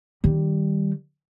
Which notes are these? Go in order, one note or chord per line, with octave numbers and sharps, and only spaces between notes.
D#3 G3